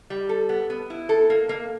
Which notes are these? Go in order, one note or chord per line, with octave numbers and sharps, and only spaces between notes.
G3
A4
B3
B3
E4
A4
A#3
A#3